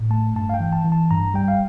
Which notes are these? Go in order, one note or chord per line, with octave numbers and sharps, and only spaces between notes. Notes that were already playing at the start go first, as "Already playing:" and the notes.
Already playing: A2
A3 A5
G2 A5
F5
G5
E3
A5
E3
A5
G2 A#5
G3 G5
F5